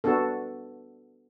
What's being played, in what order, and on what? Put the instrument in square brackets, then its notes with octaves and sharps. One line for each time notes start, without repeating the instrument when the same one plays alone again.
[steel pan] B3 D4 F#4 A4